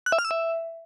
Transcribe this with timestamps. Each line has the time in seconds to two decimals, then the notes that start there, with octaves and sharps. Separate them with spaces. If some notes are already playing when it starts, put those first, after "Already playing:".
0.06 F#6
0.12 E5
0.19 F6
0.25 E6
0.31 E5